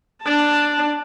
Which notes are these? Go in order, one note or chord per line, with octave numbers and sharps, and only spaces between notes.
D4 A5